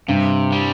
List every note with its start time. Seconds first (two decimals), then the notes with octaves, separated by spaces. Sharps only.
0.08 G2 C3
0.52 G3